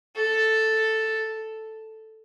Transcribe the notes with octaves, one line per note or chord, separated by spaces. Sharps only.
A4